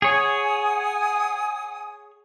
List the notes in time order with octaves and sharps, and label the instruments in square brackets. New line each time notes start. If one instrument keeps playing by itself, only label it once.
[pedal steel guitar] G#4 C#5 [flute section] F#5 G#5 D#6